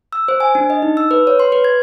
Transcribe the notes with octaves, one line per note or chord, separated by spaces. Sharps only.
E6
C5
G#5
D4
D#5
D#4
E6
B4
C#5
C6
B4
G#6